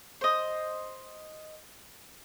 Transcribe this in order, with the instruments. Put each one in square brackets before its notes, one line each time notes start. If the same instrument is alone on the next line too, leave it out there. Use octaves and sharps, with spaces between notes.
[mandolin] C5 D#5